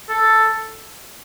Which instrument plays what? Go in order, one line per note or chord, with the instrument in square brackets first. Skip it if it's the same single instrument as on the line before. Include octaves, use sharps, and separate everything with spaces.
[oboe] A4